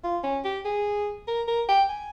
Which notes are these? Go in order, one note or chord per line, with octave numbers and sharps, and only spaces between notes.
F4
C#4
G4
G#4
A#4
A#4
G5
G#5